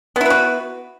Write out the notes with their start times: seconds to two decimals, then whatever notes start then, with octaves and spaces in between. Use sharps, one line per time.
0.16 B3
0.21 E4
0.26 B4
0.30 F#4